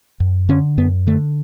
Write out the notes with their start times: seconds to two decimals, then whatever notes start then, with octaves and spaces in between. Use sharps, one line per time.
0.20 F#2
0.49 D3 C#4
0.77 F#2 B3
1.07 D3 A3